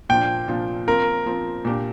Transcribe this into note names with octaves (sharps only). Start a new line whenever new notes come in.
A#2 F3 D4 F4 G5
A#2 F3 D4 F4
F3 C4 F4 A#4
F3 C4 F4
A#2 A#3 D4 G4